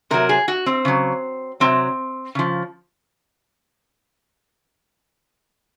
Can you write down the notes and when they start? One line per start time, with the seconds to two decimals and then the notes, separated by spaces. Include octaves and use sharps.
0.10 C3 F#3 A#4
0.29 G#4
0.48 F#4
0.66 C4
0.85 C#3 F#3
1.60 C3 D#3 F#3 C4
2.35 C#3 F3